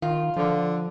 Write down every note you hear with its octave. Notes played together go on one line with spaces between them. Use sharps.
D#3 F4
D3 F3